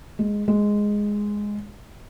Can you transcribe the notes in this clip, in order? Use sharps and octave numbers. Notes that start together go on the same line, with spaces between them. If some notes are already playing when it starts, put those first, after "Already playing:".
G#3
G#3